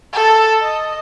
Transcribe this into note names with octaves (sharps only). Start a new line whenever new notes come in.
A4
D#5